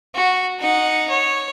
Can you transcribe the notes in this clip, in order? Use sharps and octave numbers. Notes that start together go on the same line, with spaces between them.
F#4
D#4 F#5
C#5